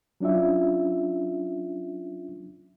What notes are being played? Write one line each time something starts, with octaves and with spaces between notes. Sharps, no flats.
F#3 C#4 D4 F4 E5